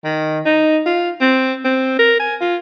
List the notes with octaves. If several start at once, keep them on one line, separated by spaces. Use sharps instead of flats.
D#3
D#4
F4
C4
C4
A#4
G#5
F4